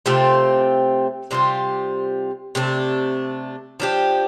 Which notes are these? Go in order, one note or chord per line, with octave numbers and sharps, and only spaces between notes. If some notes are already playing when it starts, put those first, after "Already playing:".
C3 A3 C4 F4
C3 G3 F4 C5
C3 A3 D4
F3 D4 G4